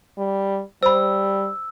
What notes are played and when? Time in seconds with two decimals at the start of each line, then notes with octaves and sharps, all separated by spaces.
0.18 G3
0.83 G3 C5 B5 E6